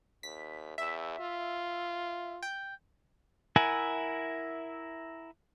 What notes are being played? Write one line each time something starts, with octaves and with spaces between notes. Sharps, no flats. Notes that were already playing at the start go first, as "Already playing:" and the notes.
D#2 B6
E2 E5
F4
G5
E4 A#4 E5 F#5 G#5